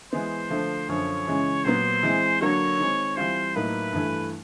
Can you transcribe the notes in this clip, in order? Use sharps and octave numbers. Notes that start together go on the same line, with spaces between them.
E3 G#3 B3 C5
D3 F3 A3
F#2 D3 F3 C#5
C#3 E3 G#3 C#4
A#2 F#3 B3 C5
E3 G#3 C4
D3 F#3 A#3 D4 F#4 C#5
D#3 G#3 C4
E3 G3 C4 F4 C5
A2 F#3 A#3 D#4 B4
G2 E3 A3